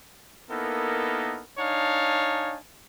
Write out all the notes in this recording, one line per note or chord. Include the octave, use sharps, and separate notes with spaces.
A#3 B3 D#4 E4 A4 A#4
D4 D#4 C#5 F5 G#5 A5